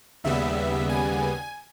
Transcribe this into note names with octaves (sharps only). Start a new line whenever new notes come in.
D#2 C#3 G3 B3 E5
G#5